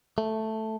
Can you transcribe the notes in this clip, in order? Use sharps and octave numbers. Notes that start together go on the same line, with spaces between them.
A3